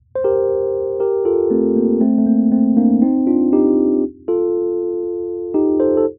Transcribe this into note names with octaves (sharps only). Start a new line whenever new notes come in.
C5
G4 A#4
G4 A#4
F4 A4
A3 C4
A#3
A3 C4
A3
A#3
A3 C4
A#3 D4
C4 D#4
D4 F4
D#4 G4
F4 A4
D#4 G4
A4 C5
A4